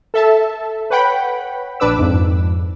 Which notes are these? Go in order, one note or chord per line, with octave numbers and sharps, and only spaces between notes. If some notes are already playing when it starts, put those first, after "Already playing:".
A4 E5 A5
B4 C#5 F#5 G5 B5
A#1 D4 B4 D6 E6
F2 G#2